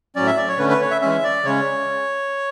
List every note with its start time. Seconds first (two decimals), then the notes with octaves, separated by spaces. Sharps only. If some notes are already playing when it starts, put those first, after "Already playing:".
0.16 A2 F#3 C#4 D5
0.27 E5
0.37 D5
0.48 C#5
0.59 D3 A3 C#4 B4
0.70 B4
0.81 C#5
0.91 E5
1.02 E3 G#3 C#4 E5
1.24 D5
1.45 C#3 G#3 C#4 C#5